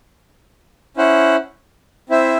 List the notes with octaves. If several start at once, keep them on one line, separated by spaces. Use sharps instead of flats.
C#4 E4 C5 F#5
C4 E4 C5 E5